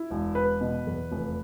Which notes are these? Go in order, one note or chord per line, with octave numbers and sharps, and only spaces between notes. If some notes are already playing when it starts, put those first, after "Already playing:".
Already playing: E4
E1
E1 B4
B2
E2
F1